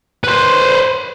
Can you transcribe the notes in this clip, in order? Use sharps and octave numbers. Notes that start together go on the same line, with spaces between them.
B4 C5